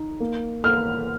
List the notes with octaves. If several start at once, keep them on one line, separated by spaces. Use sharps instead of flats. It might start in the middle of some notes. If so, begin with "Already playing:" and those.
Already playing: D#4
A#3
A#3 F6